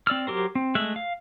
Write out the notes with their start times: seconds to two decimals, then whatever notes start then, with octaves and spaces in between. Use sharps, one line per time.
0.07 C4 D5 E6 F6
0.27 F#3 G4 A#4 C5
0.55 C4
0.75 G#3 A3 E5 F#6
0.96 F5